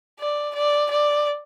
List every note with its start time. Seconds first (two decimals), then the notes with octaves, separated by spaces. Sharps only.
0.19 D5
0.55 D5
0.90 D5